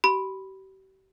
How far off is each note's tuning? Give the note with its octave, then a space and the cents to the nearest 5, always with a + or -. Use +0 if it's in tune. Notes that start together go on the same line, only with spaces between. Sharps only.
G4 -40 B5 +0